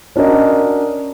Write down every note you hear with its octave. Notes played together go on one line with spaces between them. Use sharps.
C#4 D4 F#4 A#4 D#5